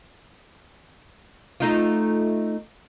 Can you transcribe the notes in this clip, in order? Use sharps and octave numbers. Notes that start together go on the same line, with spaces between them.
A3 D#4 F4